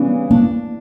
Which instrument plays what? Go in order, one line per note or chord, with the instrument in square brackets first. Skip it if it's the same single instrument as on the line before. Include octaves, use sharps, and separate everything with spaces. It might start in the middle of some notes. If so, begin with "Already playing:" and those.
Already playing: [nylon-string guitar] C#3 E3 G3 D4 [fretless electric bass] B3 C#4
[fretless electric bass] A#3 [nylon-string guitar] D4